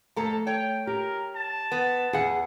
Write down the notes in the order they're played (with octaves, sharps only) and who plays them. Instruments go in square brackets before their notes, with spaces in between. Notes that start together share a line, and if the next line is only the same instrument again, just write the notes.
[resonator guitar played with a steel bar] F2 A4 A#5 [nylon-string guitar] A3
[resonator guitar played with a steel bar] C#5 [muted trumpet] G5
[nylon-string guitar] G4 [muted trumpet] A#4
[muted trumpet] A5
[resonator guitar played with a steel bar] B3
[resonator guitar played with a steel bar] E2 F#5 [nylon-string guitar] G#4